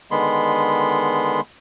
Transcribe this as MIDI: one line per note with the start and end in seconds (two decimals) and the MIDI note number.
0.11 1.41 50
0.11 1.41 51
0.11 1.41 56
0.11 1.41 59
0.11 1.41 83
0.11 1.41 84